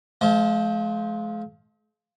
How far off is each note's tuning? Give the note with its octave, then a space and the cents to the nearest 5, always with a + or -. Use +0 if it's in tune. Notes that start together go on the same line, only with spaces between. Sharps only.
F3 +0 G#3 +45 C5 +0